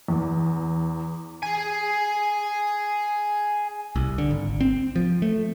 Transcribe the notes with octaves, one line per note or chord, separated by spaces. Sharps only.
E2
G#4 G#5
C2
D3
G#1
C4
F3
A3